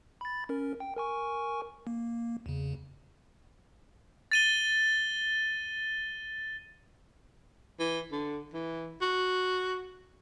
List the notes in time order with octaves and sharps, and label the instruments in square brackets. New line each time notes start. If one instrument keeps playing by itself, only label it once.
[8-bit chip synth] B5 A6
C#4 A#4
G5
A#4 G#5 C#6
A#3
E2 C#3
[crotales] A6 D#7 G7
[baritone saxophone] E3
D3
E3
F#4